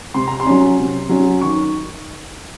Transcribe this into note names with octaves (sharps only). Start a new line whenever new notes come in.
C3 C6
A#5
C6
F#3 C#4
C3
F#3 C#4
D#3 C#6